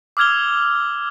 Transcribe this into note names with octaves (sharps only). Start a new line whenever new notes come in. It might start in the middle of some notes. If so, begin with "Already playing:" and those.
D6 E6 F6 G#6 F7 G7